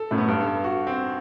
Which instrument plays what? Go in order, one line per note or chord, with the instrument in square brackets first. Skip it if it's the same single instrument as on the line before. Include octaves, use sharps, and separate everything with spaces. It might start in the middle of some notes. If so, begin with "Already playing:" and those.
Already playing: [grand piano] A4
[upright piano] F#2 A2
[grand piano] B3
[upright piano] G2
[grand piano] A4
[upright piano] G2
[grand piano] F#4
C4